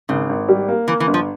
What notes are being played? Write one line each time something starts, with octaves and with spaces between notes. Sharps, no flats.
G#1 C#3
G#1
G3
A#3
E3 A#3
E3
G1
F3